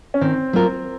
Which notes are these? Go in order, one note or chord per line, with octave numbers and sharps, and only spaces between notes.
C#4
D#3 C4
F#3 A#3 F4 A#4